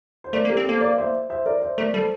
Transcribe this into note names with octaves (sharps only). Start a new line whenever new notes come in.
C5
A3 A#4 D5
A#3
G4 A#4
C4
A#3 A4 C5
A#4 D5
C5 E5
C5 E5
A#4 D5
C5 E5
A3 A#4 D5
G3 A4 C5